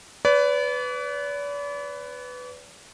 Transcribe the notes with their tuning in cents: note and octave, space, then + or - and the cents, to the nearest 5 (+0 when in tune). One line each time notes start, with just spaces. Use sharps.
B4 +15 D5 -40